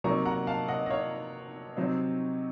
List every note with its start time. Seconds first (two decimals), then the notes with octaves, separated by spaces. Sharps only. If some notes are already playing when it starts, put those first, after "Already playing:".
0.04 C3 F#3 A#3 D#4 A#5 C#6
0.26 F#5 A#5
0.47 F5 A5
0.68 D#5 F#5
0.86 D#5
0.90 C#5 F5
1.77 C3 F#3 C4 D#4